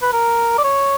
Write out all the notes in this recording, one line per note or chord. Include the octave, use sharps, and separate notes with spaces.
B4
A#4
D5
C#5